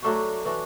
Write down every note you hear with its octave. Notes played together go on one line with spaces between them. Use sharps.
F#3 A3 D4 F#4
E3 D4 F#4